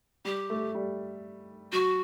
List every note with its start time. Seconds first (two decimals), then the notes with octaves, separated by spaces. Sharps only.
0.25 G3 G4
0.50 A3
0.75 G3
1.72 F#3 F#4